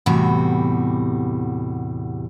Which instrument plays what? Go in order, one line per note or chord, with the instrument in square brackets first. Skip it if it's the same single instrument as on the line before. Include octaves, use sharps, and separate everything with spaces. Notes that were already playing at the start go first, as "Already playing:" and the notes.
[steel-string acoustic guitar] E2 A2 C3 G3 F#4